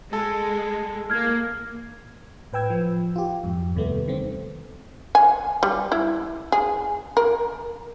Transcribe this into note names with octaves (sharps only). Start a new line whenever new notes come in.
G#3 A4
A#3 F6 G#6
A2 B4 G5 E6 G#6
F3
F4 G4
F2 G#2
D#2 C3 G3 A3 B3
D3 D#3 C4
G#5
G3
E4
G#4
A#4